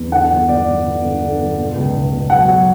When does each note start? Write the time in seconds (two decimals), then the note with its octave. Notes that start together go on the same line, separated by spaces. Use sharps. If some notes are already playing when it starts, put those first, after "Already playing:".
Already playing: E2
0.12 D3 F#5
0.30 G1
0.49 G1 D5
0.67 G1
0.85 G1
1.03 D3
1.21 D3
1.40 G1
1.57 B2
1.75 C#2
1.94 C#2
2.12 B2
2.30 F#3 F#5
2.48 F#3